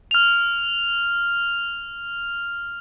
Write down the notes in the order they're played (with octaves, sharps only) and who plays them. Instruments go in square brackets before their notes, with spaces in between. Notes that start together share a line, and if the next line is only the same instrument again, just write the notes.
[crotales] F6 F7